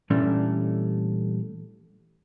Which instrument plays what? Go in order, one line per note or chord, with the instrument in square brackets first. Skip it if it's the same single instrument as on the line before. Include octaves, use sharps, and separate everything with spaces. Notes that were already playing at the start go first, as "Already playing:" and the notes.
[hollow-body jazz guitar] A#2 E3 G3 A3 C#4 D4